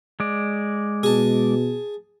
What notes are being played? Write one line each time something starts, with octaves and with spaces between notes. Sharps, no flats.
G#3 D5
B2 G#4 A5